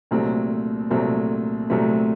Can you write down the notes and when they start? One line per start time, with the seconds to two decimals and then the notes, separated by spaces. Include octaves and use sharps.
0.11 C2 A#2 F#3 A3 C4
0.90 C2 A#2 F#3 A3 C4
1.70 C2 A#2 F#3 A3 C4